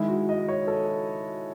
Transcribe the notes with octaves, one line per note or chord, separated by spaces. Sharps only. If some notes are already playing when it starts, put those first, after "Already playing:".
Already playing: D#3 G#3 E4
F#4
D#5
C#5
A4